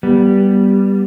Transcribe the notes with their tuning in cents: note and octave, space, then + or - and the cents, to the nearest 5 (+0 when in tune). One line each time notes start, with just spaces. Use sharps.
G3 +0 B3 -15